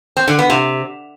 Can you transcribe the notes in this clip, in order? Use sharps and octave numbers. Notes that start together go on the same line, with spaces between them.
C4
D3
B3
C3